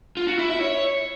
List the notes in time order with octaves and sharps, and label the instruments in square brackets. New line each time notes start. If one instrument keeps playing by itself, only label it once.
[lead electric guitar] F4
F#4
E4
E5
C#5